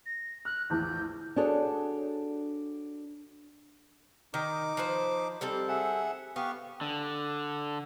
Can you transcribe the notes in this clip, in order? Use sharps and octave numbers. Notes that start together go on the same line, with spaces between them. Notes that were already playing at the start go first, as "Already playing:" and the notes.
A#6
F6 F#6
A#1 E2 A2 G6
D4 F#4 G#4 A4 C#5
D#3 D#4 D6
F3 B4 C5
G3 C4 A4
G#4 E5 F#5
B3 G4 F5 C#6
D3